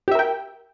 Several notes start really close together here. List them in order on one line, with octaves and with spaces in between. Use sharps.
G4 E5 A#4 G5